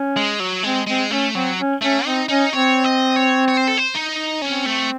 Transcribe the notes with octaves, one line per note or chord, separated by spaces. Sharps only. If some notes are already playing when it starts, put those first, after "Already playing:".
Already playing: C#4
G#3
F#3
G#3 C4
G#3 C4
A3 C#4
F#3 C4
C#4
A3 C#4
C4 D#4
C#4 D#4
C4 C#5
D#5
C#5
C#5
C5
A4
C5
D#4
C4 C#4
A3